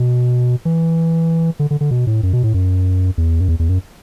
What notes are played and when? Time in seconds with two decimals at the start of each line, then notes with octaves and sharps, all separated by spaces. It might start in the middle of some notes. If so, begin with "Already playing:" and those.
Already playing: B2
0.65 E3
1.59 D3
1.71 D3
1.81 D3
1.91 B2
2.07 A2
2.23 F#2
2.33 B2
2.43 A2
2.54 F#2
3.18 E2
3.41 F#2
3.48 E2
3.59 E2
3.69 F#2